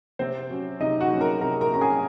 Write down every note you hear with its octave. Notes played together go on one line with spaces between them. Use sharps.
C3 C4 C5
F#3 C#4
C3 D#4 D#5
F#4 F#5
F#3 C#4
A#4 A#5
C3 A#4 A#5
A#4 A#5
F#3 C#4 A#5
G#4 G#5